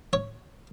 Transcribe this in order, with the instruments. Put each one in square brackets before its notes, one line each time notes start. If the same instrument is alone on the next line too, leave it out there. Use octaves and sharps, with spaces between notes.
[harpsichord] C#5